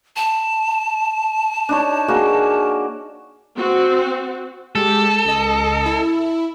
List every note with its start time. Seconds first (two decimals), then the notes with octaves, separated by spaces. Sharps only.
0.16 A5
1.69 D4 D#4 C#5
2.08 A#3 F#4 G#4
3.56 C4 F#4
4.76 G#3 G4 A4
5.25 C#2 D#5
5.86 E4